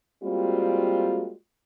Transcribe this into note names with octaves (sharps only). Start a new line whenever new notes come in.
G3 G#3 A#3 C4 F4 F#4